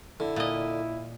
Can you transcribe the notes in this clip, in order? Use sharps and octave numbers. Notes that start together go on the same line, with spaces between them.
D3 E4
A#2 D#5